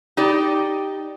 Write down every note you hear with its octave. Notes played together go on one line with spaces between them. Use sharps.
D#4 G4 D5